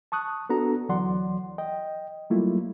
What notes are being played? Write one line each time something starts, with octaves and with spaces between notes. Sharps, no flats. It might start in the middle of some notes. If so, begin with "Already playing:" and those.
A5 C#6 D#6 F#6
B3 D4 F#4 A4 A#5
D2 E3 F#3 D5 F#5 C6
D#5 G5
F#3 G3 A3 A#3 E4 F4